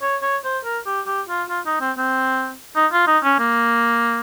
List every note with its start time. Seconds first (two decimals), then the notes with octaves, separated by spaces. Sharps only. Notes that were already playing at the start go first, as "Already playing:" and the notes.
0.02 C#5
0.22 C#5
0.44 C5
0.64 A#4
0.86 G4
1.06 G4
1.28 F4
1.49 F4
1.66 D#4
1.81 C4
1.97 C4
2.76 D#4
2.92 F4
3.07 D#4
3.24 C#4
3.39 A#3